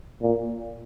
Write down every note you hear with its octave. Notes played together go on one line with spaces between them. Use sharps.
A#2